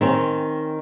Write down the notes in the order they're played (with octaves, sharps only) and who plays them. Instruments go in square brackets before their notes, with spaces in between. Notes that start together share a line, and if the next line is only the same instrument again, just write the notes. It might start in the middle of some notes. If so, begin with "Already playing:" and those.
[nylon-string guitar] D#3 C4 C#4